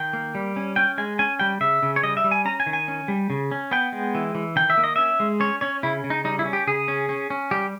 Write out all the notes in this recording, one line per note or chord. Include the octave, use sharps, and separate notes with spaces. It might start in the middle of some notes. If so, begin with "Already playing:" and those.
Already playing: D#3 G5
A#3
G3
C#4
C#4 G5
G#3 G#5
C#4 G#5
G3 G5
C#3 E5
C#3
C#5
G3 D#5
E5
G3
G#5
C#4 A#5
G#5
D#3
G#5
C#4
G3
C#3
C#4
B3 G5
G#3
E3
E3
D#3 G5
E5
A#3
D#5
C#4 E5
G#3
C#4 C#5
C#4 C#5
C#3 E4
C#3
D#4
G3 D#4
E4
C#4
G4
C#3 G#4
C#4
C#4
C#4
G3 G4